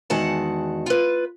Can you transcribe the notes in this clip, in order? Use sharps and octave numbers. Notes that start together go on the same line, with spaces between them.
E2 D#3 G#3 F#4 F#5 A5
F4 B4